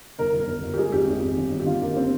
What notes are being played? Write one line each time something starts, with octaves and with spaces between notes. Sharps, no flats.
G1 A#4
G1
A#4
G1
G1
G4
G#3 G#4
G#1 G4
G#1
G#1
G1
G1
G4
D3 F4
G1 A#3
C4